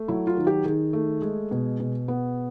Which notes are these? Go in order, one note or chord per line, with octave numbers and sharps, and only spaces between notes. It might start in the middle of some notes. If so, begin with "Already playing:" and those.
Already playing: A3
F#3 E4
F4
D#3
G4
D#3 G#4
A3
G#3
B2
B2
B3